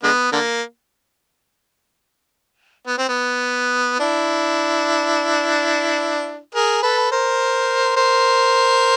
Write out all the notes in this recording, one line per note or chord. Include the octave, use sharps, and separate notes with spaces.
D3 G#3 B3
D3 A#3
B3
C4
B3
D4 E4
G#4 A#4
A4 B4
A#4 C5
A#4 C5